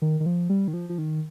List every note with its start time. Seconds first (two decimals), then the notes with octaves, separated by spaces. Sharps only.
0.02 D#3
0.20 D#3
0.26 F3
0.50 G3
0.68 D#3
0.73 F3
0.89 F3
0.98 D#3